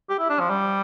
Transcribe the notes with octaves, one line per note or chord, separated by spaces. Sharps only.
G4
E4
D4
F3
G3